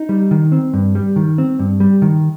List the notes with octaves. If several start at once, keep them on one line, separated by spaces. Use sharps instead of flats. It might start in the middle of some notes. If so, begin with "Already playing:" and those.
Already playing: D#4
G3
D#3
C4
G2
G3
D#3
C4
G2
G3
D#3